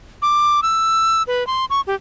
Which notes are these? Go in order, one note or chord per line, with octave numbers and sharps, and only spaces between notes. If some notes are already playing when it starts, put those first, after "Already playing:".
D6
E6
B4
C6
C#6
G4